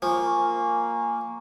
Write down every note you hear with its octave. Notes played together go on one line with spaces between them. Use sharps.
F3 A#3 G#5 C#6